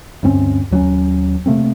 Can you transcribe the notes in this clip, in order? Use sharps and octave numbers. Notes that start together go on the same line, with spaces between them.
D2 G2 C4 C#4
D#2 F#3 B3 C#4
C3 A3 A#3 C4